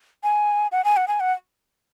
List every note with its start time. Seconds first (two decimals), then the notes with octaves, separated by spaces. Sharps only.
0.23 G#5
0.72 F#5
0.85 G#5
0.97 F#5
1.08 G#5
1.20 F#5